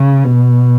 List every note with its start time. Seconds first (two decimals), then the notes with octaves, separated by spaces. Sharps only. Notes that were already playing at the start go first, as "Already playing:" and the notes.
Already playing: C#3
0.24 B2